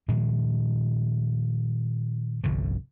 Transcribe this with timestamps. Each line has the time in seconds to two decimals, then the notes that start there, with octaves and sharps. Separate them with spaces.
0.08 A#2 D#3 F3 G#3
2.44 G1 C2 D3 F3